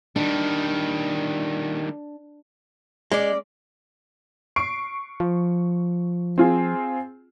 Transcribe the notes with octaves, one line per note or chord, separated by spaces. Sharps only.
D#3 G3 D4
G#3 C#4 D5
C#6 C7 D7
F3
C4 F4 G#4